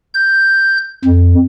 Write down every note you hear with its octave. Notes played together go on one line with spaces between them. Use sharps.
G6
F2